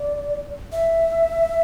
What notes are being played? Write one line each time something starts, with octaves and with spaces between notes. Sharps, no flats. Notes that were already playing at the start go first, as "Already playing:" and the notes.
Already playing: D5
E5